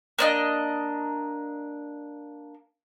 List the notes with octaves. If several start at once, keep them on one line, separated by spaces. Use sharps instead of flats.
A#3 D4 D#5